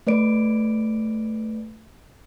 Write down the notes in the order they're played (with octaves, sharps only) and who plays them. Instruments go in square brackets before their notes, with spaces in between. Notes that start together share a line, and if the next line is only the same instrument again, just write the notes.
[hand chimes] A3 B4 D5 D7